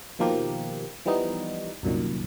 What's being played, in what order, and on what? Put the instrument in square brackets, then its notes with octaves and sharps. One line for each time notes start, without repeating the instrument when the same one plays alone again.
[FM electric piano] B2 D#3 F3 A#3 G4
E3 F3 G3 B3 D#4
C2 F#2 A#2 D#3